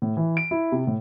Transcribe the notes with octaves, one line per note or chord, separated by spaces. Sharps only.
A2
E3
D7
E4
C3
A2